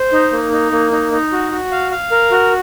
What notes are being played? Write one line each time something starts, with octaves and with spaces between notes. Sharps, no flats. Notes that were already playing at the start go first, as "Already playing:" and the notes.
Already playing: C5
D#4
A#3
D#4
A#3
D#4
D#4
F#4
F#4
F5
F5
A#4
F#4